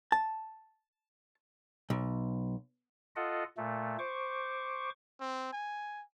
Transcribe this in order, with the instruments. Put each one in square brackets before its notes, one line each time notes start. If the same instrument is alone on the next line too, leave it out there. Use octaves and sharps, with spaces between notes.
[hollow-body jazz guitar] A5
B1
[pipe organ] F4 A4 D#5 F#5
A#2 A3
C5 C#6 D6
[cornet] C4
G#5